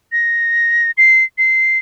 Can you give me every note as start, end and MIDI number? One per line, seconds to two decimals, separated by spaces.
0.12 0.91 94
0.98 1.24 96
1.38 1.78 96